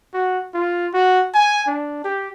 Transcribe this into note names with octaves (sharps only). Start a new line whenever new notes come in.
F#4
F4
F#4
G#5
D4
G4